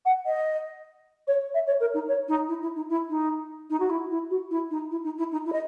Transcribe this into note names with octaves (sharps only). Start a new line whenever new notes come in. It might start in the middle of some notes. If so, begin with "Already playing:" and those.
F#5
D#5
C#5
E5
C#5
A#4
D#4
C#5
D#4
E4
E4
D#4
E4
D#4
D#4
F#4
E4
E4
F#4
E4
D#4
E4
D#4
E4
D#4
E4
D#5